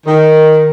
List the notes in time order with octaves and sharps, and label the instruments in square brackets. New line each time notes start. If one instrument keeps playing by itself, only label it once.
[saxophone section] D#3